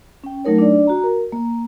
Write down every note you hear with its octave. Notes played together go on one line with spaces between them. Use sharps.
C#4 G5
F#3 A3 D#4 A#4 C#5
D4 D5
F#4 A#5
A#4
A#3